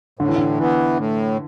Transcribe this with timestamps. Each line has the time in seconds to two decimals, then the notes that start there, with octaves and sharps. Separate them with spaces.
0.19 A2 D3
0.29 E3
0.36 D3
0.58 E3 B3
0.98 A2